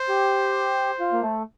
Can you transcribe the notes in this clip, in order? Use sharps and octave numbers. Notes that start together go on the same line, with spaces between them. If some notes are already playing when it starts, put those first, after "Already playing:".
Already playing: C5
G4
F4
A#3
A3